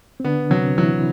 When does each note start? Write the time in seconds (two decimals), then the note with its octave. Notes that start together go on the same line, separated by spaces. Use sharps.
0.20 C4
0.24 D3 B3 D4
0.50 C3 F#3 C4
0.77 E3 F#3 E4